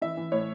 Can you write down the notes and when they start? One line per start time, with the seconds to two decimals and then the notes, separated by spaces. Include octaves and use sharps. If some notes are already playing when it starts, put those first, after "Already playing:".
0.01 E3 E5
0.17 E3
0.32 A2 C#5